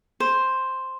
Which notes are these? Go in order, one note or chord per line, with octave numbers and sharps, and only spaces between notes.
C5